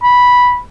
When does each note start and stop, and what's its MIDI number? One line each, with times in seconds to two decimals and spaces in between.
0.03 0.58 83